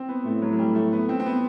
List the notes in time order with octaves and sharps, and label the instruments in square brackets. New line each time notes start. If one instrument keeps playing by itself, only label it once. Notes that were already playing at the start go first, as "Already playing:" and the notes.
Already playing: [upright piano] C4
B3
[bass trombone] A2 [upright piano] A3
[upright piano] F#3
F#3
G3
A3
B3
C4
C4
B3